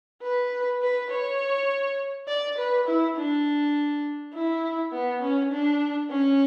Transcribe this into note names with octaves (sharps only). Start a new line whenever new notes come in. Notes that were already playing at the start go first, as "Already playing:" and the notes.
B4
B4
C#5
D5
B4
E4
D4
E4
B3
C#4
D4
C#4